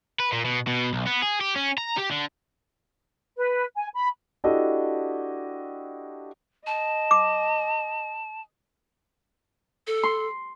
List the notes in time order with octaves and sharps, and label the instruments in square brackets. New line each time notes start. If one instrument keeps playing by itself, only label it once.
[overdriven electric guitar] B4
A#2
B2
B2
B1
B3
G#4
G4
C#4
A#5
G4
D3
[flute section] B4
G#5
B5
[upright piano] D4 E4 F#4 G4 A4 D#5
[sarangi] D#5 [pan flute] A5
[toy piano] D6
[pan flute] A4
[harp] C6